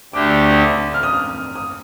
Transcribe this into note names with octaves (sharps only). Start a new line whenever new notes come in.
D2 D3 A3 D4 G4 D6
D#6
F6
D#6
F6
D#6